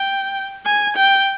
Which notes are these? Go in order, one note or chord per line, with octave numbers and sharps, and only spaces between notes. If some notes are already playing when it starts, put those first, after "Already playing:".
Already playing: G5
G#5
G5